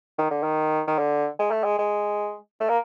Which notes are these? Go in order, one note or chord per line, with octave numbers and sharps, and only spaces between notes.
D#3
D3
D#3
D#3
D3
G#3
A3
G#3
G#3
A3
A#3